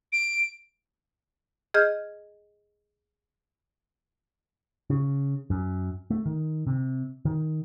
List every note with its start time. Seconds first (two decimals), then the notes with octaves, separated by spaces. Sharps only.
0.12 D7
1.74 G#4 D#5 F6 G6
4.90 C#3
5.50 F#2
6.10 A3
6.26 D#3
6.67 C3
7.25 D#3